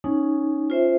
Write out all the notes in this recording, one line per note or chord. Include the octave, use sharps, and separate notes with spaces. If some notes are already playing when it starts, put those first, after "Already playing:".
C#4 D#4
F4 C5 E5